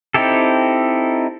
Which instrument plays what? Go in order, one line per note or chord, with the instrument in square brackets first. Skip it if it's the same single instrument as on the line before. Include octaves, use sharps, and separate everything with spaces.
[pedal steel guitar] C4 D#4 E4 G4 A4